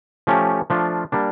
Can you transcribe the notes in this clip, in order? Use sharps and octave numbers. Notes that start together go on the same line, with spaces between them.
F3 A3 C#4 G4
F3 A3 D4 F4
G3 A#3 D4